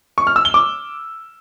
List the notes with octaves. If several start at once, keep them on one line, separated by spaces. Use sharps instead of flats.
C#6
F6
E6
G7
D6